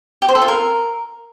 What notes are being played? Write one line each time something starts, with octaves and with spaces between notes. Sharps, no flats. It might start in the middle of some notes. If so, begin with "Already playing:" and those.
G4
C5
A4
F4
A#4